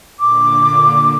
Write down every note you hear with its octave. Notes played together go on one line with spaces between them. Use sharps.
A#2 D3 D6